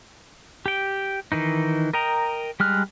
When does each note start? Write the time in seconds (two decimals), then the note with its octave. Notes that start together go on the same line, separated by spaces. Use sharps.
0.66 G4 G5
1.32 D#3 E3 D#4
1.93 A#4 D#5 G5 A#5
2.60 G3 G#3 F6 F#6